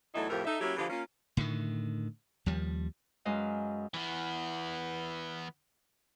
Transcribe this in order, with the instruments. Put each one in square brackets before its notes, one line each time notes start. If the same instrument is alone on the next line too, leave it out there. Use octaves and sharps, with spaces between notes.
[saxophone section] E2 F#3 A3 D#4 E4
F2 A2 F3 A3 G4 A#4
D#4 A4 E5
F#3 A#3 C#4 E4 F#4 G4
D3 E3 F3 G#3 F4 G4
A#3 C#4 F4
[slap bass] A2 D3 D#3
D#2 F3 G3
[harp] F#2 G#3 B4 D#5 F5
[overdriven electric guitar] E3 B3